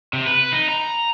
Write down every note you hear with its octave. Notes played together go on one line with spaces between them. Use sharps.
C3
B4
D#4
A#5